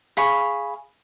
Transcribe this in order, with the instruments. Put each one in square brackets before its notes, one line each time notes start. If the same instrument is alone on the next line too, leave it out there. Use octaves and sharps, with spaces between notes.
[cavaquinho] G#4 F5 B5 C#6